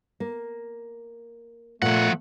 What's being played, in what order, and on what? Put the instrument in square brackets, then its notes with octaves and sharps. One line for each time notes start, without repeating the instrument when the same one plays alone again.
[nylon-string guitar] A#3
[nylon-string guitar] A#2 [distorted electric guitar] F3 F#5 [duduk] A3